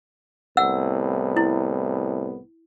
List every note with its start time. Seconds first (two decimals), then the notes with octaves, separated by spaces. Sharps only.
0.57 C2 A2 B3 F#5 E6
1.37 E4